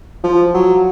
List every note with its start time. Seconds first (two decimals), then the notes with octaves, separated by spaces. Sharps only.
0.24 F3
0.54 F#3